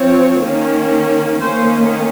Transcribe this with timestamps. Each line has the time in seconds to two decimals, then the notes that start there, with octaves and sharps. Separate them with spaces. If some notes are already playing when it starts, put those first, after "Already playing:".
Already playing: F3 C4 C#5
0.43 D#3 A#3 C#4
1.41 D#3 A#3 C#4 C5